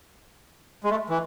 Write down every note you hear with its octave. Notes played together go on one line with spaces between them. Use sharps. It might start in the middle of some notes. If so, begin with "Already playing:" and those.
G#3
A3
E3